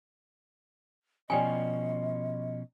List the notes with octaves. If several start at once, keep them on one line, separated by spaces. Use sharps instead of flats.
B2 F3 C#4 D5 D#5 G5 G#5